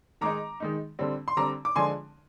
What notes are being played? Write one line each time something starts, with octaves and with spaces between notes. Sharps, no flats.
D#3 G#3 D#4 A#5 D6
D#3 G#3 D#4
D3 G3 C4
C6
D3 G3 C4 A#5 D6
D6
D3 F3 G#3 D4 G#5 C6